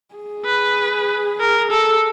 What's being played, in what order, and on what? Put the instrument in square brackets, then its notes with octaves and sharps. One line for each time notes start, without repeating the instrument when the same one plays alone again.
[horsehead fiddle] G#4
[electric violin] B4
A#4
A4